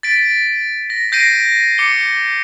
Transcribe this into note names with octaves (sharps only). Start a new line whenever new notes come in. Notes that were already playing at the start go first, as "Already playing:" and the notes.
A6 B6 D7
A#6
G6 A#6 C7 D7 D#7
D6 C#7 G7